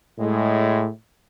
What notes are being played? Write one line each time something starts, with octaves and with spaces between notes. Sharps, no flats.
A2 G#3